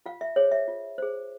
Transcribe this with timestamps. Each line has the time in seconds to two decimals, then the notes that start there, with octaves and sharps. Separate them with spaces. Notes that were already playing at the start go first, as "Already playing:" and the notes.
0.06 F4 F5
0.21 E5
0.36 G#4 C5 C#5
0.52 E5
0.68 F4
0.98 G#4 C5